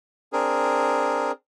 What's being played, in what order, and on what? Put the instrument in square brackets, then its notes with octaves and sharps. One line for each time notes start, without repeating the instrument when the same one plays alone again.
[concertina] C4 D4 G#4 A#4